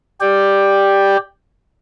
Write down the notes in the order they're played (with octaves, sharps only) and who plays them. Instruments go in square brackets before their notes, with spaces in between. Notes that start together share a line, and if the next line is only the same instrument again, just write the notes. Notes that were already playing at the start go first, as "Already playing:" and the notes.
[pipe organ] G4 D5 G5